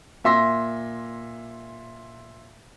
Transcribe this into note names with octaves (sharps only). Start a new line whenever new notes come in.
A#2 E5 C6 A#6